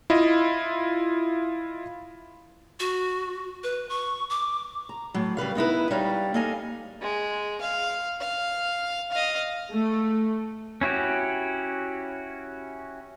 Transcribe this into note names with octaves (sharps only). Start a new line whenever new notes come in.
E4 F4 D#5
F#4
B4
C#6
D6
A#5
A2 F#3
C#3 G3 B4 F5
B3 D#4 E4 B4
G3 D#4 C#5 F5
A#3 A4 D#5 F5 G#5
G#3
F5
F5
D#5 F5
A3
C#4 E4 F#4 G4